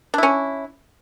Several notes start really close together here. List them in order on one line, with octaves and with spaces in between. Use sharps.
D4 E4 C#4